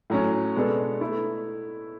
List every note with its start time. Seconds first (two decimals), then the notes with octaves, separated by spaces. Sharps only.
0.10 A2 F#3 C#4
0.56 B2 G#3 B3 D4 A4
1.01 A3 E4